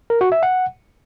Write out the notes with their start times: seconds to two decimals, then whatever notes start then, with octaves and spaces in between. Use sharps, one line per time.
0.10 A#4
0.21 F#4
0.32 E5
0.43 F#5